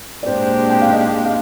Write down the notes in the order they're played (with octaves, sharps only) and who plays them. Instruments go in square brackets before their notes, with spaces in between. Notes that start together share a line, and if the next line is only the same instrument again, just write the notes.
[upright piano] D5
[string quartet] A#2 G#3 D4 G4 [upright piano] C5
[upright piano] G5
F5
D#5
F5